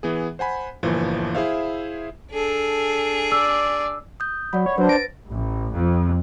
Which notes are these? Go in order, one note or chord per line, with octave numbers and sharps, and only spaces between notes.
E3 B3 G#4
C5 F#5 G#5 B5
G1 A#2 E3 F3
E4 G#4 C5 E5 F5
D4 G#4 A4
D5 E6
D#6 G6
F#3 D5 F#5 B5
C#5
F#3 D4 B4 C5
A6 A#6 D7
A1
F2